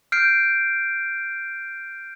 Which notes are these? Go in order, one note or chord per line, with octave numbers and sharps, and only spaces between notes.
F6 G6 C7 D7